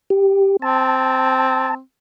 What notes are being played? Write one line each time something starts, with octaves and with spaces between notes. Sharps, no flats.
G4
C4 A5